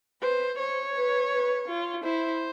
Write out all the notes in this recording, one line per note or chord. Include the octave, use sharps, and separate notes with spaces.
B4 C5
C5 C#5
B4
B4
F4
E4 C5